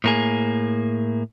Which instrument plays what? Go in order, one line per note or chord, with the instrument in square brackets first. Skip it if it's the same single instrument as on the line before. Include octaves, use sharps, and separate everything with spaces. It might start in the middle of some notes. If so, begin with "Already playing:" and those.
[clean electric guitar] A2 A#3 G#4